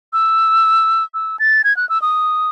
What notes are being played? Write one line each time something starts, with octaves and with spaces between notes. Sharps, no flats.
E6
E6
A6
G#6
F#6
E6
D#6